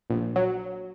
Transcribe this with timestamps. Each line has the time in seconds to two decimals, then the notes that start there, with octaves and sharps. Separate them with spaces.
0.10 A#1
0.36 F#3